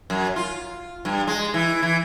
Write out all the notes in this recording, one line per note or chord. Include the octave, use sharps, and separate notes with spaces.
F#2
F4
G2
G#3
E3
E3